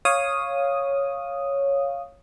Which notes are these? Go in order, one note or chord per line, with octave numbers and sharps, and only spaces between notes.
C#5 F5 D#6